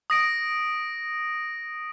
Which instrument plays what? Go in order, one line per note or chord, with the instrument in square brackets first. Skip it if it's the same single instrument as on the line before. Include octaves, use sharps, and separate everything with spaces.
[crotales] D#6 A#6 D7